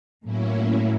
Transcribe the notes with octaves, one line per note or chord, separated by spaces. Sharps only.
A2 F#3 A#3 C#4 E4